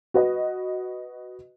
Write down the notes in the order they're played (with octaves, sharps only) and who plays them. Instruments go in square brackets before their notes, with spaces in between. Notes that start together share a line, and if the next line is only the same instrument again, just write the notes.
[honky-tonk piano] F#4 B4 D#5